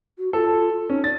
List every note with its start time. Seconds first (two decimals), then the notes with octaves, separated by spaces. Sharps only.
0.19 F#4
0.33 F4 A4
0.90 C#4 D#4
1.04 D5 A6